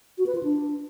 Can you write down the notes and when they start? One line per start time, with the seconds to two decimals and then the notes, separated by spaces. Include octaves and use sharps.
0.18 F#4
0.26 B4
0.35 F4
0.43 D4